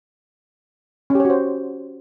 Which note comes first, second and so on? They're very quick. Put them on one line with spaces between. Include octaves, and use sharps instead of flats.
C#4 G4 C#5 F#4 C5